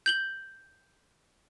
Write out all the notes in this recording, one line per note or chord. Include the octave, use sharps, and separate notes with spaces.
G6 F#7 G7